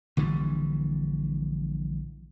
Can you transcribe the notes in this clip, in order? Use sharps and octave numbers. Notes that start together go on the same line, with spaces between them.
A#1 D3 E3 G3